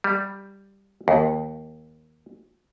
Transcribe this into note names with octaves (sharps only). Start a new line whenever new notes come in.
G3
D#2